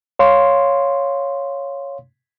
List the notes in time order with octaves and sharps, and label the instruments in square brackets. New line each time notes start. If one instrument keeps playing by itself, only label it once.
[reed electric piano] C#5 F5 C6